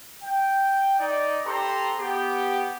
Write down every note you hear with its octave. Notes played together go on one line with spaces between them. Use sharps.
G5
D#4 D5
C4 G4 A4 B4 A#5 C6
B3 G4